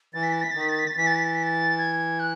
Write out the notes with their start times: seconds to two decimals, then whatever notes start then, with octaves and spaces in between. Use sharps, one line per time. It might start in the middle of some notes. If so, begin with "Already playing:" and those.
0.14 E3 A6
0.23 B6
0.32 A6
0.42 B6
0.51 A6
0.55 D#3
0.61 B6
0.69 A6
0.79 B6
0.87 A6
0.97 E3 B6
1.07 A6
1.16 B6
1.25 A6
1.34 B6
1.43 A6
1.78 G#6
2.20 F#6